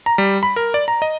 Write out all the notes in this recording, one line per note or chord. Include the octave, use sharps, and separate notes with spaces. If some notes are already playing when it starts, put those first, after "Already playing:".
A#5
G3
B5
A#4
D5
A#5
D#5